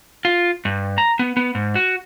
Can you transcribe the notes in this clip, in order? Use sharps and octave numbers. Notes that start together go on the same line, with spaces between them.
F4
G2
A#5
B3
B3
G#2
F#4